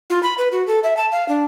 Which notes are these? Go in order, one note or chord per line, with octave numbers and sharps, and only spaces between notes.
F4
B5
B4
F#4
A4
E5
A5
F5
D4